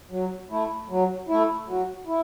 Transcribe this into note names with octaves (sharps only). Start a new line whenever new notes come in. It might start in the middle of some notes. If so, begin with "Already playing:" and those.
F#3
A3 E4
F#3
A3 E4
F#3
E4